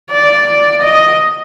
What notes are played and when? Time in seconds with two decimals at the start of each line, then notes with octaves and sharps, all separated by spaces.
0.11 D5
0.82 D#5